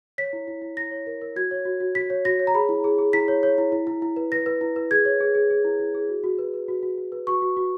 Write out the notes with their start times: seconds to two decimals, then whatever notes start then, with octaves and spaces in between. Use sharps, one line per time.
0.18 C#5 B6
0.33 E4
0.48 E4
0.62 E4
0.77 E4 A#6
0.91 C#5
1.07 A#4
1.21 A#4
1.36 F#4 G#6
1.51 C#5
1.65 F#4
1.80 F#4
1.95 F#4 B6
2.10 C#5
2.25 F#4 A#6
2.39 C#5
2.47 A#5
2.54 G#4 B5
2.69 E4
2.84 G#4
2.98 G#4
3.13 E4 B6
3.28 C#5
3.43 C#5
3.58 E4
3.72 E4
3.87 E4
4.02 E4
4.16 B4
4.32 B4 A#6
4.46 B4
4.61 E4
4.76 B4
4.91 G#4 G#6
5.05 C#5
5.20 G#4
5.35 G#4
5.50 G#4
5.65 E4
5.79 E4
5.95 G#4
6.09 F#4
6.24 F#4
6.38 B4
6.54 B4
6.68 F#4
6.83 F#4
6.98 F#4
7.12 B4
7.27 F#4 C#6
7.42 F#4
7.57 F#4